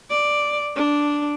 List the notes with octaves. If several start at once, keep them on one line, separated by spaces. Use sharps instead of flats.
D5
D4